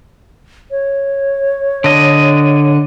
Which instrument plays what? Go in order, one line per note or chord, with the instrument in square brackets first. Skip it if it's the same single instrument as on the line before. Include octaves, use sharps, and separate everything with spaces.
[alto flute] C#5
[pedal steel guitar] D3 D#5